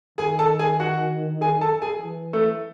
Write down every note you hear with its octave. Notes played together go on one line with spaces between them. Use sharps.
D#3 G#4 G#5
A4 A5
G#4 G#5
F#4 F#5
G#4 G#5
A4 A5
G#4 G#5
E3
A3 A4